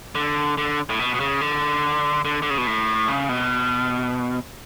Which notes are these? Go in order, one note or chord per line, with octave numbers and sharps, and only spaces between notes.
D3
D3
A2
B2
B2
C#3
D3
D3
D3
C#3
B2
A2
C#3
B2